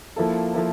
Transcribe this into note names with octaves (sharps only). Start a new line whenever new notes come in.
F3 A#3 E4 A4
F3 A#3 E4 A4